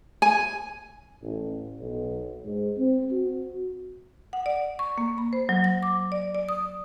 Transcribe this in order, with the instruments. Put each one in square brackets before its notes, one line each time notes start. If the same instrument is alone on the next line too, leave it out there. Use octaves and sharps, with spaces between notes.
[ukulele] G#5
[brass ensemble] A1
B1
G#2
C4
F#4
[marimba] F#5
D5
C#6
A#3
B5
C5
F#3
A#6
D6
D5
D5
D#6